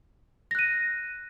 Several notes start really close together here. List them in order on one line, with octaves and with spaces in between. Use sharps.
A#6 F#6 D#7